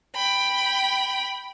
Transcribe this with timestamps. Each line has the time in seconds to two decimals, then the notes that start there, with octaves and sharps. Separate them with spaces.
0.16 G5 B5